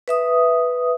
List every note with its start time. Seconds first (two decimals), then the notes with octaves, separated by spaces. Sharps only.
0.08 B4 E5 D#6